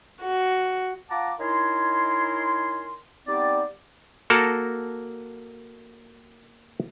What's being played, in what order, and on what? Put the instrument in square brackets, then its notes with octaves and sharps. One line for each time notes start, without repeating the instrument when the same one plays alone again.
[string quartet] F#4
[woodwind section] F4 F#5 A5 A#5 D6
D#4 E4 A#4 C#5 G#5 C6
G3 B3 C4 D#4 D5
[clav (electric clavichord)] A#3 F#4 A4 A#4 A5